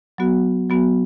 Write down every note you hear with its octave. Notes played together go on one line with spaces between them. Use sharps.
F#3 B3 F#4
F#3 B3 F#4